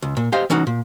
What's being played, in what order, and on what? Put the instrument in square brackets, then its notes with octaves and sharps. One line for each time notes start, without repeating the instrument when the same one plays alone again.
[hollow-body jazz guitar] C#2
A#2
G4 C5 D#5 F5
E3 C#4 D#4 F#4
A#2